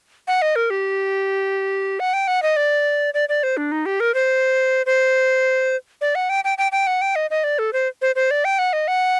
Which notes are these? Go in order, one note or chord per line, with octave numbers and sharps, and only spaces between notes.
F#5
D#5
A#4
G4
F#5
G5
F#5
D#5
D5
D5
D5
C5
D4
D#4
G4
A#4
C5
C5
D5
F#5
G5
G5
G5
G5
F#5
G5
D#5
D#5
D5
A4
C5
C5
C5
D5
G5
F#5
D#5
F#5